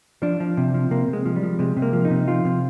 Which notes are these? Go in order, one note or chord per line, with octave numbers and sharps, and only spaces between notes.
F3 D4
F3
C3
F3
C3 A#3
C3
G#3
F3
G3
F3
C3 G#3
C3
A#3
F3
D#4
C3
F3 F4
C3